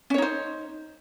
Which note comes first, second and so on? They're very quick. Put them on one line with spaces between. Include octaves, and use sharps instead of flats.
C#4 C#5 D#4 C5